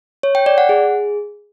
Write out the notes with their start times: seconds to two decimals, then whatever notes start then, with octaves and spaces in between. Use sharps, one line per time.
0.23 C#5
0.35 G5
0.46 D5
0.58 F#5
0.69 G#4